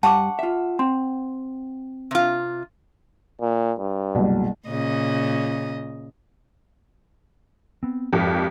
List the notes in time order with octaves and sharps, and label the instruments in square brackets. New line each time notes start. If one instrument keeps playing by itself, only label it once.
[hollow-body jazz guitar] G2 [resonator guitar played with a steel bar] F#5 [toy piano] A5 C#6 D6
[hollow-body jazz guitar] F4 E5
[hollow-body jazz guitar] C4 [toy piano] C6
[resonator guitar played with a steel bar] C3 F4
[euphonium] A#2
G2
[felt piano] F#1 C2 B2
[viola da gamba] A#2 C#3 D#5
[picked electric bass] B3 C4
[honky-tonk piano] G#1 F2 G4 [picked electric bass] F3